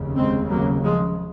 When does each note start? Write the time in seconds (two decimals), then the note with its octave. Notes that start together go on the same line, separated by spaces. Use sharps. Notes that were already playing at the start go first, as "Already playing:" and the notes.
Already playing: F1 D#2 C#3
0.17 G#3 C4
0.50 F#3 A#3
0.83 F3 G#3